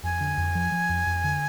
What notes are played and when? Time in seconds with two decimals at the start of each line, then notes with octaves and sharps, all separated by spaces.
0.04 F2 G#5
0.21 D3
0.38 F2
0.55 F3
0.72 F3
0.89 F2
1.06 F2
1.24 D3